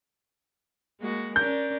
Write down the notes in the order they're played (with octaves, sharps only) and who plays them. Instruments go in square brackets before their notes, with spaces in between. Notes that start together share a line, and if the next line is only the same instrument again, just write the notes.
[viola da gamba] G#3 A#3 F#4
[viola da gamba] C#4 D4 A#4 [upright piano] G6